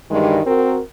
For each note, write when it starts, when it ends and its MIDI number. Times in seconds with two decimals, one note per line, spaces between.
0.11 0.41 43
0.11 0.41 51
0.11 0.41 52
0.11 0.41 55
0.11 0.41 56
0.46 0.81 60
0.46 0.81 66
0.46 0.81 70